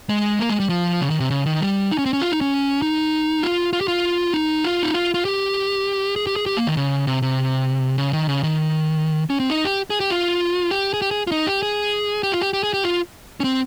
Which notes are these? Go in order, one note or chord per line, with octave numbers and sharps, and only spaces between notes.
G#3
A#3
G#3
G3
F3
C#3
D#3
C3
C#3
D#3
G3
D#4
C#4
C4
C#4
F4
D#4
C#4
D#4
F4
F4
G4
F4
D#4
F4
D#4
F4
F4
G4
G#4
G4
G#4
G4
A#3
D#3
C#3
C3
C3
C#3
D#3
C#3
D#3
C#4
C4
D#4
G4
G#4
G4
F4
G4
G#4
G4
G#4
F4
D#4
G4
G#4
G4
F4
G4
G4
G#4
G4
F4
C#4
C4